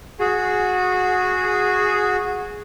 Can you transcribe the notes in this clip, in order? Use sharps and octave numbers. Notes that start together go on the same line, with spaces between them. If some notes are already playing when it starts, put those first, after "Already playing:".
F#4 G#4